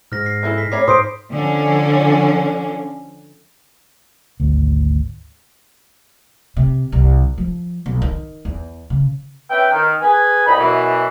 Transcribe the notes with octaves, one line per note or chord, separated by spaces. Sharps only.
G#2 F6 A#6
C7
E3 E4 A4
B6
A3 C#5 B5 D6 C7
G#2 C5 D#6 C7 D7
D3 F3 C#4
G#1 D2
C3
C2
F3
B1
D#3
E2
C#3
C#4 B4 E5 G5
D#3
G#4 B4 G#5
C2 D#4 B5
F#2 B2 E3